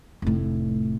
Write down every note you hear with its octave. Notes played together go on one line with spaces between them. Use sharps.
F1 A2